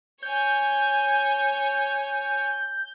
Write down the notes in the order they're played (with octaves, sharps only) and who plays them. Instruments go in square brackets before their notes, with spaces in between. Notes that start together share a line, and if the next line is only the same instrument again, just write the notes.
[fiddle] C#5 G#5 [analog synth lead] G6